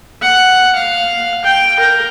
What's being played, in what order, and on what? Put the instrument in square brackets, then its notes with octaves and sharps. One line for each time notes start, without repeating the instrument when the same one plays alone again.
[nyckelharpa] F#5
F5
G5
A#4